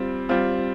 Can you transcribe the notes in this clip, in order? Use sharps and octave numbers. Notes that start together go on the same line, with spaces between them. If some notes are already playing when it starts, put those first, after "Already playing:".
Already playing: G3 C4 F4
G3 C4 F4